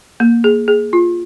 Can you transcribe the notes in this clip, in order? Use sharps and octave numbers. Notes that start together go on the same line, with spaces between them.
A#3
G#4
G#4
F4